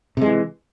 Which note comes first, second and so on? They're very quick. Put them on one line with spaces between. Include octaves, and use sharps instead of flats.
C3 G#3 E3